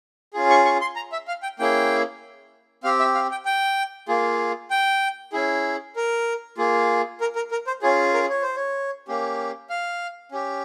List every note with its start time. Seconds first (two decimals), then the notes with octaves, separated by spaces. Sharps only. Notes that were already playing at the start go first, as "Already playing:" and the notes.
0.34 C#4 F4 G#4
0.50 C#6
0.65 C#6
0.81 C6
0.96 A#5
1.12 E5
1.28 F5
1.43 G5
1.59 A#3 C#4 E4 G#4 G5
2.84 C4 G4 F5
2.99 E5
3.15 F5
3.31 G5
3.45 G5
4.08 A#3 F4 G#4
4.71 G5
5.33 C#4 E4 G#4
5.96 A#4
6.58 A#3 F4 G#4
7.21 A#4
7.36 A#4
7.51 A#4
7.67 C5
7.82 C#4 F4 G#4 C#5
8.14 A#4
8.29 C#5
8.42 C5
8.56 C#5
9.08 A#3 C#4 G4
9.70 F5
10.32 C#4 G4